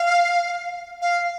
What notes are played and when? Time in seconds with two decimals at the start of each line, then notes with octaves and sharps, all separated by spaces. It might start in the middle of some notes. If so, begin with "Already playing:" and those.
Already playing: F5
1.02 F5